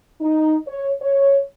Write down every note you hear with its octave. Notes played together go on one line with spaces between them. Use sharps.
D#4
C#5
C#5